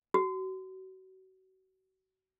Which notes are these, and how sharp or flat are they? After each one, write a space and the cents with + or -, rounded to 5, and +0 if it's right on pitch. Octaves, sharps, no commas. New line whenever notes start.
F#4 +30